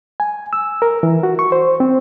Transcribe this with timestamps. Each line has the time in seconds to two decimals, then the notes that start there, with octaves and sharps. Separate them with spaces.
0.20 G#5
0.53 E6
0.82 A#4
1.03 E3
1.23 F#4
1.39 C#6
1.52 C5
1.80 C4